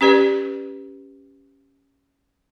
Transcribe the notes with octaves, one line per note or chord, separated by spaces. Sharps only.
C#4 G4 B4 D5